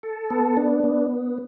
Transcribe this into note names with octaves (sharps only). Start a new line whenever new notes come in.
A4
B3
D4
B3